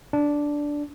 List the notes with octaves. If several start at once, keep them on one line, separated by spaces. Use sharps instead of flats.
D4